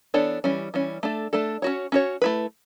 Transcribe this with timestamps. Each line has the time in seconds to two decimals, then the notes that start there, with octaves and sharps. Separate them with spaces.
0.14 E3 B3 D4 A4 C#5
0.44 E3 G3 C#4
0.74 E3 G3 C#4
1.03 A3 D4 A4
1.33 A3 D4 A4
1.62 C#4 F#4 C#5
1.92 C#4 F#4 C#5
2.22 A3 E4 B4